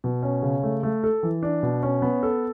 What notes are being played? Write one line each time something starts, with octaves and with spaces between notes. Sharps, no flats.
B2
C#4
C#3
A3
A3
A4
E3
D4
B2
C#4
B3
A4